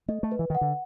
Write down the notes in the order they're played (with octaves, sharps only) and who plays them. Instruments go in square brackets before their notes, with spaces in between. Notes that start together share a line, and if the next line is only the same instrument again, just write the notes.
[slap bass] A3 [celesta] D#5
[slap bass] A3
[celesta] B4
[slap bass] E3
[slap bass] D#3 [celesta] F#5
[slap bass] D3